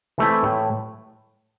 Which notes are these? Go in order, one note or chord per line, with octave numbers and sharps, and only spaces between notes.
E3 A3 C4 E4
A2